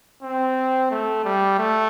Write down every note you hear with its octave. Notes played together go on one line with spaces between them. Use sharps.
C4
A3
G3
A3